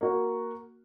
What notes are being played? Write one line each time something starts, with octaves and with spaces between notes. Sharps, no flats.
A#3 F#4